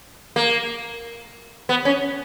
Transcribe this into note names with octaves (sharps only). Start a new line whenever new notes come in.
A#3
B3
C#4